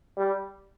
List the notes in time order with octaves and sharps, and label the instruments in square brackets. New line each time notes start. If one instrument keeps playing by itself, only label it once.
[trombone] G3